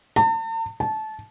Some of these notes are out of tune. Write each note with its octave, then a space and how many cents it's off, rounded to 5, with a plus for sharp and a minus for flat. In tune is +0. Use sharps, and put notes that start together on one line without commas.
A5 +45
A5 -20